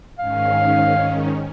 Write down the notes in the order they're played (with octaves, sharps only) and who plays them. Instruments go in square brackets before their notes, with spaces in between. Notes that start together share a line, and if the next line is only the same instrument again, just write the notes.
[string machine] G#2 D#3 C#4 [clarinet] F5